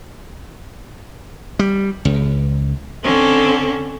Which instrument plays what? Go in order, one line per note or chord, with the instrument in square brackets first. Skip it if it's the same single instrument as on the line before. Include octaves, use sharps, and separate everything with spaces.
[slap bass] G3
C#2
[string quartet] D3 C4 C#4 A4